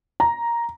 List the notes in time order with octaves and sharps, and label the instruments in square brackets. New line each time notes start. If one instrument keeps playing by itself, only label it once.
[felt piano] A#5